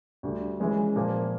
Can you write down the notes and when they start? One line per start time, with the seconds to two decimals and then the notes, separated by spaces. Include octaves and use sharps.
0.23 D2 D3 G3
0.60 E3 G#3 C#4
0.96 A#2 F3 A#3